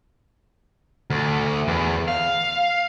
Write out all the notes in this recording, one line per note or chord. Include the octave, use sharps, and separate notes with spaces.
D2
E2
F5